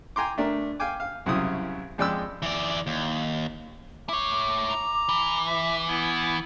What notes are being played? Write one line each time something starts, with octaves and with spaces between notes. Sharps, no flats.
G5 G#5 A#5 C6 D6
A3 D4 A#4
F5 G5 G#5 D6
F5
C2 F#2 C#3 E4 D#6
F2 G#3 D5 G5 B5 E6
E3 D5
D#2
E4 C#5 D6
A#5
E3
E5
B3 E4